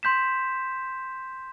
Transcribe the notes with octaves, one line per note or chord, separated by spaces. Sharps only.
C6 G6 B6 E7